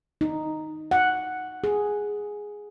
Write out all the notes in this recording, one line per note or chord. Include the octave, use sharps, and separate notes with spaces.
D#4
F#5
G#4